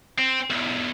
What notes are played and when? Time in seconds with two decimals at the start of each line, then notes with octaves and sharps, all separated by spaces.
0.18 C4
0.50 B1 E2